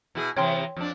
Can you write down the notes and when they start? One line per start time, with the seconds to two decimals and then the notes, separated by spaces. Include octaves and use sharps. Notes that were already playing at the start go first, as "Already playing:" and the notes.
0.15 B2 E4 G#4
0.37 C3 E3 C#5 G5 C6
0.77 F2 D4